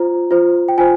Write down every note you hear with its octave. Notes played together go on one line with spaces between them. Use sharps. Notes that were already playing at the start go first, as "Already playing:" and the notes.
Already playing: F4 C5 A#5
F4 C5
G5
F4 C5 G#5